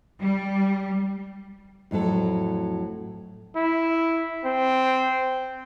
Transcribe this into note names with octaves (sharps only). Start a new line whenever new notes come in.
G3
F2 A2 F#3 A4
E4
C4